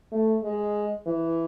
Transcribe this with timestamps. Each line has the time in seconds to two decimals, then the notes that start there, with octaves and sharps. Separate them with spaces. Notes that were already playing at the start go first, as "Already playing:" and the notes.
0.12 A3
0.44 G#3
1.06 E3